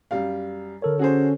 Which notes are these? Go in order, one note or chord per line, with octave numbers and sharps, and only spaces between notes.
F#2 G3 F5
D3 A4 A#4 C#5
C#4 F#4 G#4 C5